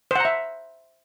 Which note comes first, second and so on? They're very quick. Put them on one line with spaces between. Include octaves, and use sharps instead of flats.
C5 F#5 A#5 E5